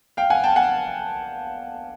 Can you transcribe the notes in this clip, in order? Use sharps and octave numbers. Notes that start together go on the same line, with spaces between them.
F5 G5
F#5 G#5
G5 A5
F#5 G#5